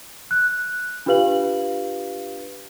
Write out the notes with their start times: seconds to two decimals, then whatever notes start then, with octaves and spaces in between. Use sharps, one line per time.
0.31 F#6
1.06 D4 F4 G4 B4 F5 F#7